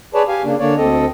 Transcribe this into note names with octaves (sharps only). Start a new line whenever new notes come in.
G#4 B4 C#5 D5 A5
G4 F5 G#5
C#3 A#3 D4
D3 A#3 D4 C#5 D5
D2 C4 A4 D#5